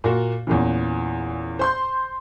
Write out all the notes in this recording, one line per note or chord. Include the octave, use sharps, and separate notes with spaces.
A#2 A#3 F#4
E2 A#2 C#3 E3
C5 C6 G6